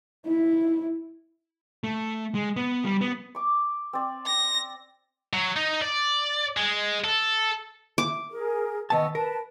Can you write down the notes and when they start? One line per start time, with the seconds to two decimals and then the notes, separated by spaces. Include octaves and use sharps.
0.26 E4
1.84 A3
2.35 G#3
2.56 B3
2.85 G3
3.01 B3
3.35 C#6 D6
3.93 C4 D5
4.26 A#6
5.33 F#3
5.56 D#4
5.82 D5
6.57 G#3
7.04 A4
7.98 D6
8.30 G#4 A#4
8.90 D#3 B3 D#5 A5 C#6 E6
9.15 A#4 B4 A5